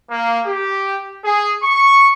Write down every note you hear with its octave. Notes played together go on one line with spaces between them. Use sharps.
A#3
G4
G#4
C#6